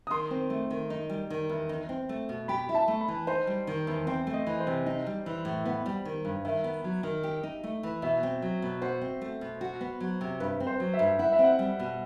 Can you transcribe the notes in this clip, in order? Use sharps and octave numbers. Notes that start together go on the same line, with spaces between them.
D#6
D#3 C6
C4
A3
D#3
D#4
G3
D#3
E2
D#4
C4
A3
B2
G4 B5
E4
A5
A3
B5
E3
D#4 C5
G3
D#3
E2
C4 C5
A3
D#5
E3
C5
C3
D#4
G3
E3
A2
B3
G3
D#3
G2
D#3 E5
B3
F#3
D#3
G4
D#4
A3
E3
B2 E5
C4
F#3
B2
F#4 C5
C4
A3
B2
F#4
B3
F#3
C3
G2 B4
C4
C5
F#3
E5
G2
E4 F#5
E5
C4
F#5
G3
B2